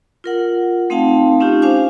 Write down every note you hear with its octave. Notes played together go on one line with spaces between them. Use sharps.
F4 A#4 F#5
A3 C4 D#4 F5 G5 A5
C#4 D#4 F4 G4
D4 C5 F5 G#5 D6